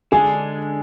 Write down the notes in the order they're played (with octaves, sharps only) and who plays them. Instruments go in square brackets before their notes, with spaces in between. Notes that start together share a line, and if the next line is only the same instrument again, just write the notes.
[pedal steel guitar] D3 G#3 D4 [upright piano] G#4